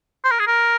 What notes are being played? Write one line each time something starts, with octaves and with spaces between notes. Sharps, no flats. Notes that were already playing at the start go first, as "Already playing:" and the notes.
C5
A#4
G#4
A#4